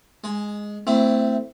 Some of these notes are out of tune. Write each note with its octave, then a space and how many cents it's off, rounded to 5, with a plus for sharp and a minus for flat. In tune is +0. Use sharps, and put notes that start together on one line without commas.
G#3 +0 G#5 +30
A3 +20 C4 -15 E4 +0